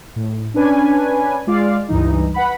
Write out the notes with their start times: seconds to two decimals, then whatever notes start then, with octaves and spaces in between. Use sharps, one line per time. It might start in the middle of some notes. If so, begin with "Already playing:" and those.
0.16 A2
0.54 C#4 D4 B4 G#5
1.47 G#3 F4 D5 F5
1.89 C#2 G2 E3 D#4
2.34 B4 F#5 B5